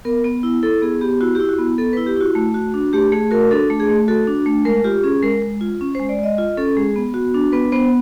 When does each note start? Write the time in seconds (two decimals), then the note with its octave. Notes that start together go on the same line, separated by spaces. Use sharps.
0.05 B3 A#4
0.24 B3
0.43 E4
0.63 E4 A4
0.82 B3 G#4
1.01 B3 G4
1.21 E4 F#4
1.35 G4
1.40 E4
1.49 F#4
1.59 B3
1.78 B3 A4
1.93 B4
1.97 E4
2.07 G4
2.17 E4 F#4
2.35 A3
2.54 F#4
2.74 D4
2.93 A3 G4
3.12 A3 G#4
3.31 F#4 A#4
3.51 D4 A4
3.70 A3
3.80 G#4
3.89 A3
4.08 F#4 A4
4.27 D4
4.46 A3
4.65 G#3 A#4
4.84 F4 G4
5.04 C#4 G#4
5.22 G#3 A#4
5.42 G#3
5.61 F4
5.81 C#4
5.95 C5
5.99 G#3
6.09 D5
6.19 G#3 D#5
6.38 F4 D#5
6.57 C#4 A4
6.77 G#3 G#4
6.96 B3
7.14 F#4
7.34 D4
7.52 B3 B4
7.72 B3 C5